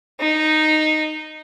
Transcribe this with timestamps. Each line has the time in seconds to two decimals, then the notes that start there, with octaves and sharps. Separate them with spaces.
0.20 D#4